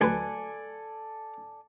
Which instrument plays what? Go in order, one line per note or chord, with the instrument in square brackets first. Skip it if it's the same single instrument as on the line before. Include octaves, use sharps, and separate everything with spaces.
[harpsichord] D2 F#3 B4 [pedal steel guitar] A4 D5 G#5